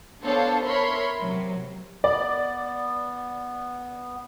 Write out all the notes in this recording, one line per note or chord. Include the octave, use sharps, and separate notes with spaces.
B3 D4 A4 C5 C#5 F5
A#4 C#5 E5 B5 C6
C3 F#3
B3 D5